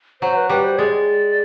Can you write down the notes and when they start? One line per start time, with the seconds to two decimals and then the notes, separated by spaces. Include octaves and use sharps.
0.21 F#3 C5
0.36 B4
0.49 G3 B4
0.64 C5
0.78 G#3 D5